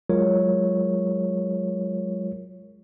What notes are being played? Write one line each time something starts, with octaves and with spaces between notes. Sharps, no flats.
F#3 G#3 F4 A#4 C#5